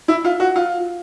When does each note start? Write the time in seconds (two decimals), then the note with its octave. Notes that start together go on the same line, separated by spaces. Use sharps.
0.08 E4
0.25 F4
0.40 F#4
0.56 F4